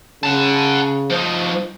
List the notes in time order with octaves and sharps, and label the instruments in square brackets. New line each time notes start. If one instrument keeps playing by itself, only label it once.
[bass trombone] C#3 [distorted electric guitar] F#5 A5
[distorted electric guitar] F3 D#4 [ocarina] C5